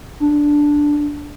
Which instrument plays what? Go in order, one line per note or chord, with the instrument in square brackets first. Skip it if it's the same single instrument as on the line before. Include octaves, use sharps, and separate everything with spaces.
[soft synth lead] D4